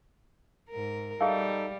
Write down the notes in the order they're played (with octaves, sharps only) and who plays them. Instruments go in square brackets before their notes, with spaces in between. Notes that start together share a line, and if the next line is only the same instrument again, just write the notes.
[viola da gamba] G#2 A#4
[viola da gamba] G3 [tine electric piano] D#4 A4 [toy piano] G#4 E5 F5